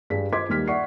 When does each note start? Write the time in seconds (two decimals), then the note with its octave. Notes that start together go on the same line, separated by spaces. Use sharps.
0.10 G2 D4 G#4 B6
0.32 C5 D#5 C6 D6 G#6 B6
0.49 D#2 G3 A#3 F6 B6
0.67 D5 E5 F#5 C#6 C7